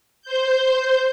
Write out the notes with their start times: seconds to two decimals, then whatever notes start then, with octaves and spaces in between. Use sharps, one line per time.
0.22 C5 G6